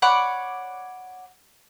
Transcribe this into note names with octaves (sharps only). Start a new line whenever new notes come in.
C#5 D5 F#5 B5